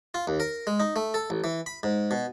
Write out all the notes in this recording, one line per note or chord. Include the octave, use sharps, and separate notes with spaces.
F4
D#2
A#4
G#3
D#4
A3
A4
A1
E3
B5
G#2
B2